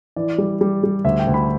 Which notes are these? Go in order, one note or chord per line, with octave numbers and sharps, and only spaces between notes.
E3 D5
G3
G3
G3
D2 E5
G5
D2
B5